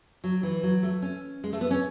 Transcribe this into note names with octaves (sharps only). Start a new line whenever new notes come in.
F#3
E3
F#3
A3
C#4
G#3
A3
B3
C#4